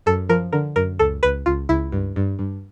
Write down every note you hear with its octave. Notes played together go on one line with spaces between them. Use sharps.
F#2 A4
F3 A#4
D3 A#4
F#2 A#4
C#2 A4
C#2 B4
C#2 F4
C#2 E4
G2
G2
G2